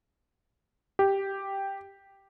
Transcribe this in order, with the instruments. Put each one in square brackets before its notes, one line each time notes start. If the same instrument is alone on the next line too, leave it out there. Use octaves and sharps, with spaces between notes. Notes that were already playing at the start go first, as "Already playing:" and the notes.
[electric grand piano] G4